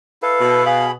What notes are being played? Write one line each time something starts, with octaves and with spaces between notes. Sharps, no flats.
E4 A4 B4 F5
B2
G#4 F5 B5